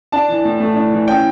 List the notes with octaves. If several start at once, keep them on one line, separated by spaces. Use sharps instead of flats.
D4 A5
E3
A2
A3
D4
E3
C#4 G5